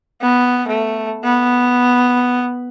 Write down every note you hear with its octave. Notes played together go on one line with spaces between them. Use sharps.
B3
A3
B3